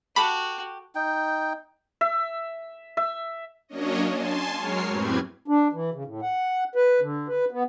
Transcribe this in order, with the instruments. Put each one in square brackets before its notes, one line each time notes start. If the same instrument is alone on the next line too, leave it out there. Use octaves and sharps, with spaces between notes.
[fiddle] F#4 [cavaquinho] G4 A4 F#5 [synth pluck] B5
[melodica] D#4 G5
[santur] E5
E5
[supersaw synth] F#3 A#3 C#4 D4 C#5 D#5
G#5 A5 C6
F#3 G#3 A#4 C#5 F6 C7
F#2 A2 C4 G4 B4 G#6
[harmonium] D4
E3
C#3
A2
F#5
B4
D3
B4
B3